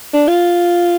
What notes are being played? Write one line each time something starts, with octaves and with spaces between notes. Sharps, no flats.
D4
F4